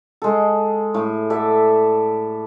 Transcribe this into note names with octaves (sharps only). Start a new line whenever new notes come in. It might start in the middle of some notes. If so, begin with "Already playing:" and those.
G#3 A4
A2
A4 D5 E5